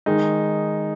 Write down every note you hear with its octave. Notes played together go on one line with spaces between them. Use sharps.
D#3 G#3 D#4